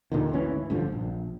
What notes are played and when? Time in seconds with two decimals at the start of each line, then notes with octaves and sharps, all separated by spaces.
0.12 D#2 A#2 D3 D#3
0.33 G#1 D2 E3 C#4
0.70 A1 G2 D3 F3
0.92 A#1